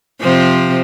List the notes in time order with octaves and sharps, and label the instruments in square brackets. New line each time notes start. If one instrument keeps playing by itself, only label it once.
[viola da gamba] C3 F3